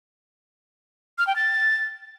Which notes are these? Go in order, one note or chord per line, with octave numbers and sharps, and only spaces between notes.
F6
G5
A6